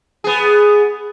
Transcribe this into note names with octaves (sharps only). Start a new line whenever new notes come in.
B3 G#4